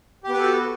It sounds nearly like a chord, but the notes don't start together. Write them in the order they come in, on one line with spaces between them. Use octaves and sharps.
G4 B3 B4 A4 F#4